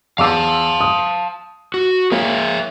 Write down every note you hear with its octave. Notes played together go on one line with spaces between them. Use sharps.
E2 F5 A5 D6 E6
D#6
F#4
A#3 G#4 C#5 E5